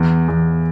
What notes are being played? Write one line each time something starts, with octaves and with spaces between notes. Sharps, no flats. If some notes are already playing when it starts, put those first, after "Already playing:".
Already playing: E2
E2